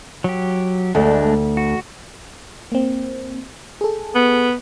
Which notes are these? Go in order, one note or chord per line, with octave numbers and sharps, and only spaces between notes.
F#3 G4
D2 G#3 A3 D4
F#4
A#3 C4
G#4 A4
B3